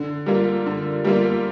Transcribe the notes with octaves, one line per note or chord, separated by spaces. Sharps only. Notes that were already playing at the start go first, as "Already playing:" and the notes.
Already playing: D3
G3 A#3 F4
D3
G3 A#3 F4